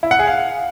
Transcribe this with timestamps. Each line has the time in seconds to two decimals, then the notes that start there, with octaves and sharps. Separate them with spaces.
0.03 E4
0.11 F#5
0.19 G#4
0.27 F5